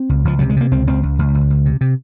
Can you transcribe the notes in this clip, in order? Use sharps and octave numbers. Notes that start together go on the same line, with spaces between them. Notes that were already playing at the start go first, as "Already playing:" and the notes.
Already playing: C4
C#2
C#2 F3
C3 F#3
G#3
C3 A#3
C#2 C4
C#2 C4
C#2
C#2
C#2
C#2
C3
C3